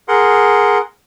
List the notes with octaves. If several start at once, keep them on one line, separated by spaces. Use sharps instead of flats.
G#4 A#4 F#5 C6